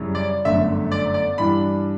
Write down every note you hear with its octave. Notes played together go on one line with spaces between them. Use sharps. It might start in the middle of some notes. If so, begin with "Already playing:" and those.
Already playing: F#2 C#3 G3 C#4 E4
D5
G1 F#2 D3 A3 E5
D5
D5
G2 E3 G3 D4 B5